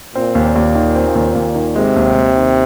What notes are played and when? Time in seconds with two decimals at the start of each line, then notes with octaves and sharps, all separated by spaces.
0.15 A#2 C4
0.35 D#2
0.56 D#2
0.75 D#3
0.95 C4
1.15 D#2
1.35 D#2
1.55 D#3
1.76 C3 G#3
1.96 D#2
2.16 D#2
2.36 D#3